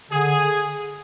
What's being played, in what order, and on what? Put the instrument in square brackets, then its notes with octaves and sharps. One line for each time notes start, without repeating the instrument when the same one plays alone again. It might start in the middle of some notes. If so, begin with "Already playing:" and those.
[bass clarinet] D3 [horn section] G#4